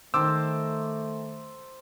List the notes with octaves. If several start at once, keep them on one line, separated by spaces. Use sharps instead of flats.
D#3 A3 C5 A5 A#5 D6 E6